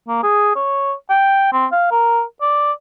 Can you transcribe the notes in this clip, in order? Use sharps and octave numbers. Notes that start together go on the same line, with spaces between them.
A#3
G#4
C#5
G5
C4
F5
A#4
D5